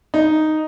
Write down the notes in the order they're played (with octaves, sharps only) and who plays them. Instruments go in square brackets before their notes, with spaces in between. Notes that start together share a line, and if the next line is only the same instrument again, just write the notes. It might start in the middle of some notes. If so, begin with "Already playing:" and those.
[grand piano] D#4